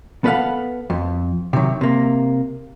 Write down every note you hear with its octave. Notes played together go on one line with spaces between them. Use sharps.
B3 A4 B4 C#5 F5 F#5
F2
C3 D#3 F#3
C3 A#3